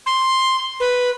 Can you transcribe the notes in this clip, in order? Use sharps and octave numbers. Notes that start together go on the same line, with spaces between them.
C6
B4